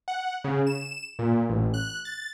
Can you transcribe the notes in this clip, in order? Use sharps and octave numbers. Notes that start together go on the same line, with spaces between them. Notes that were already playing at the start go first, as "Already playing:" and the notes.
F#5
C#3
E7
A#2
A1
F#6
A6